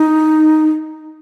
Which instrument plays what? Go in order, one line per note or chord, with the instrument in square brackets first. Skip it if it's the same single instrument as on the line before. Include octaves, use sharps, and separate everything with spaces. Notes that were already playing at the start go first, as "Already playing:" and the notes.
Already playing: [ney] D#4